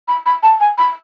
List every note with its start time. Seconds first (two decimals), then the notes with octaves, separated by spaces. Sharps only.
0.08 B5
0.26 B5
0.43 A5
0.60 G#5
0.78 B5